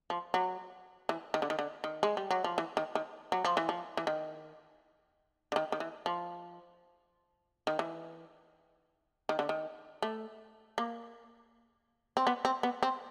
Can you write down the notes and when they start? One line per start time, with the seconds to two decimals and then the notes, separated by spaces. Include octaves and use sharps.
0.10 F3
0.34 F#3
1.09 E3
1.34 D#3
1.42 D3
1.50 D#3
1.59 D3
1.84 D#3
2.03 G#3
2.17 G3
2.31 F#3
2.44 F3
2.58 E3
2.77 D#3
2.95 D#3
3.32 F#3
3.45 F3
3.57 E3
3.69 F3
3.97 E3
4.07 D#3
5.52 D3
5.56 D#3
5.72 D#3
5.80 E3
6.06 F3
7.67 D#3
7.79 E3
9.29 D#3
9.39 D3
9.49 D#3
10.02 A3
10.78 A#3
12.17 C4
12.27 B3
12.45 C4
12.63 B3
12.83 C4